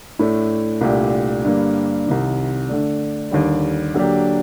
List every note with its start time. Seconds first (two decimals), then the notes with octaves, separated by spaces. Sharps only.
0.19 A2 A3 D4
0.81 C2 A#2 A3 D4 G4
1.44 G2 D3 G3 A#3 D4
2.06 C2 C3 D#3
2.69 D3 A3 D4
3.31 D#2 D3 G3
3.94 D3 F#3 A#3 D4 G4